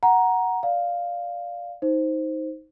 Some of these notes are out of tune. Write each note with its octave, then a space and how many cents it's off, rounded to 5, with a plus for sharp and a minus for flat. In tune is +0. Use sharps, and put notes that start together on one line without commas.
F#5 +0 A#5 +10
D5 +0 F5 +0
D#4 +15 C5 +0